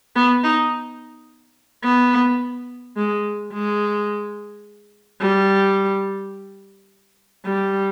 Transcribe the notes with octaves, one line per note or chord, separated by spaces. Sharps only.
B3
D#4
B3
G#3
G#3
G3
G3